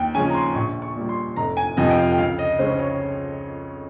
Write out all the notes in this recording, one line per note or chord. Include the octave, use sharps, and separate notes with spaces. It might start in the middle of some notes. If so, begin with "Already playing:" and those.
Already playing: D#2 G5
C#3 F3 G#3 C#4 G#5
A#5
C6
A#1 C#6
C#6
A#2 G3
C6
F1 A#5
G#5
F2 C3 F3 D#5
G5
F5
G5
C#2 F5
D#5
C#3 G#3 C#4 C5
C#5